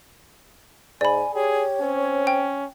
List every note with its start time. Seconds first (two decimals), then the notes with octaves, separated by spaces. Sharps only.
1.01 G#2 D5 G#5 B5
1.35 G4 G#4 C#5
1.82 C4 C#4
2.27 G5